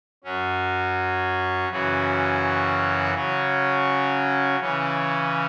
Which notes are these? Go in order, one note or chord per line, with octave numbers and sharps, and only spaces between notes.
F#2 F#3 C#4
F#2 C#3 E3 C#4 F#4
C#3 F#3 C#4
C#3 E3 C#4